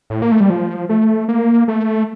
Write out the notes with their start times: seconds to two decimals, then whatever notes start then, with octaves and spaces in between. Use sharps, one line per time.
0.10 A2
0.22 A#3
0.32 A3
0.40 G3
0.50 F3
0.89 A3
1.28 A#3
1.68 A3